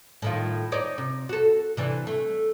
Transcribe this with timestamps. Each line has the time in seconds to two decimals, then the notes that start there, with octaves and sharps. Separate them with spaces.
0.22 A2 D#3 F4
0.72 D#4 C#5 D5
0.98 C3
1.29 F#4 A4
1.77 C3 E3 D4
2.07 A3